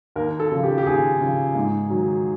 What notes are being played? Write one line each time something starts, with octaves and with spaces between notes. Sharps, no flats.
D#2 A#4
A4
C#3 F3
G4
G4
D#2 G#4
C#3 F3
G#2
D#3 F#3